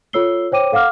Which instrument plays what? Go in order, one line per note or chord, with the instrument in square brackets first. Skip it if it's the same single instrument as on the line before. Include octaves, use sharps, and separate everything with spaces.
[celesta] F4 A4 C#5 E6 C7 G7
C5 C#5 G5 D6 D#7
A4 F5 F#5 D6 F6